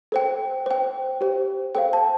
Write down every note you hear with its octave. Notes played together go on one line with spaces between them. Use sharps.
A4 C5 G5
C5 G5
G4 C5 G5
A4 C5 F5 G5
A5